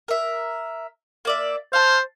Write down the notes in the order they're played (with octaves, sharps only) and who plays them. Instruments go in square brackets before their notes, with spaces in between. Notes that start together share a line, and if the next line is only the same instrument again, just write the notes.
[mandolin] A#4 E5
A#3 D5 E5
[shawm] C5 [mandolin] F5 A5